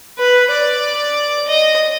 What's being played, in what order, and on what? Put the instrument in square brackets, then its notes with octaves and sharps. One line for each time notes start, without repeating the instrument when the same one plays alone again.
[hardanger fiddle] B4
D5
D#5